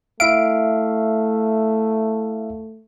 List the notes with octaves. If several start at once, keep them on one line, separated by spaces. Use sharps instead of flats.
A3 E4 E5 F5 D7